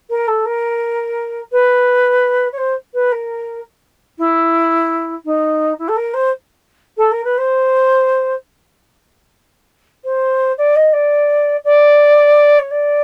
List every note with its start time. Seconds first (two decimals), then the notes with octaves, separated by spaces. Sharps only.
0.09 A#4
0.27 A4
0.45 A#4
1.51 B4
2.52 C#5
2.57 C5
2.93 B4
3.11 A#4
4.18 E4
5.24 D#4
5.78 E4
5.88 A4
5.96 A#4
6.13 C5
6.97 A4
7.11 A#4
7.24 B4
7.37 C5
10.04 C5
10.57 D5
10.75 D#5
10.92 D5
11.64 D5
12.58 C#5
12.70 D5